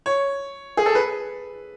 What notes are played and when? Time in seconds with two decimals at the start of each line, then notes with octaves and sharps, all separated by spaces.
0.06 C#5
0.77 G#4
0.86 A4
0.95 B4